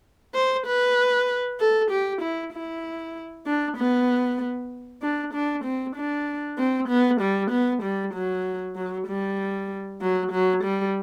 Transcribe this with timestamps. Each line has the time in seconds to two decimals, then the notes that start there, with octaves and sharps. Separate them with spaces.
0.34 C5
0.66 B4
1.60 A4
1.91 G4
2.22 E4
2.53 E4
3.46 D4
3.77 B3
5.02 D4
5.33 D4
5.64 C4
5.96 D4
6.58 C4
6.89 B3
7.21 G3
7.51 B3
7.83 G3
8.14 F#3
8.76 F#3
9.07 G3
10.01 F#3
10.32 F#3
10.64 G3